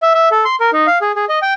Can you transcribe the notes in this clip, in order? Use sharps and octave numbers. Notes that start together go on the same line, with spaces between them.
E5
E5
A4
C6
A#4
D#4
F5
G#4
G#4
D#5
G5